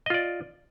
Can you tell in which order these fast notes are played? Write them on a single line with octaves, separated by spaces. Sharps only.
D#5 F4 D5